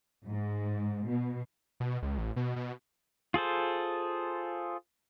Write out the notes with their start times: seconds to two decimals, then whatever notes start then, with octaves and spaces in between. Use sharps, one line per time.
0.24 G#2
1.07 B2
1.80 B2
2.02 C#2
2.18 A1
2.36 B2
2.56 B2
3.34 F4 G#4 A4 C5